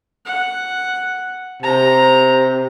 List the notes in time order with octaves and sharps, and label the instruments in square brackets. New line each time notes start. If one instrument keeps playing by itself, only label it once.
[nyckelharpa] F#5
[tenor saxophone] C3 [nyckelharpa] A#5